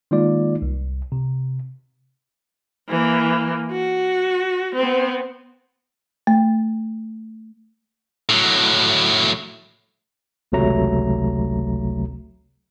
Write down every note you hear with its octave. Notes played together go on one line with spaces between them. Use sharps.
D#3 G#3 A#3 D#4 F4 D5
C2
C3
E3 A#3
F#4
B3 C4
A3
A2 F#3
G#1 C#2 C3 F#3 A3 A#5